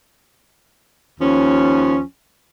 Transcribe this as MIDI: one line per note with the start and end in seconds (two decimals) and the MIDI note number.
1.20 1.99 39
1.20 1.99 53
1.20 1.99 61